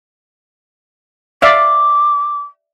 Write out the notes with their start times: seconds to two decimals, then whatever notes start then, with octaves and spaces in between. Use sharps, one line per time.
1.42 D5 E5 F5 D6